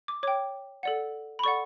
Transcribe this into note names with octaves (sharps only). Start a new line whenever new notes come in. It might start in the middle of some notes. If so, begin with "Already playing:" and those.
D6
C#5 G5 D6
A4 D5 F#5
B5
A4 D5 F#5 C#6